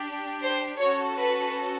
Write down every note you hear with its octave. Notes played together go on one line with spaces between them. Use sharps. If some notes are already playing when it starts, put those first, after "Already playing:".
Already playing: D4 G4
C5
C#4 F#4 A4 C#5
B4